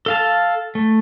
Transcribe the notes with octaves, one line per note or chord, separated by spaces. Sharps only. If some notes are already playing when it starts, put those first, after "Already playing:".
A4 F5 A5
A3